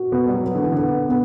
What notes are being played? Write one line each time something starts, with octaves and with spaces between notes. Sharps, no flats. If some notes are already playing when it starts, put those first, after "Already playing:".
Already playing: F#4
B2 B3
G3
F#3
B3
D3
E3
D3 B3
B3